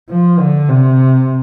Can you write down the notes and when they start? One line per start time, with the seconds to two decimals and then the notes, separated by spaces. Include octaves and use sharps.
0.09 F3
0.39 D3
0.68 C3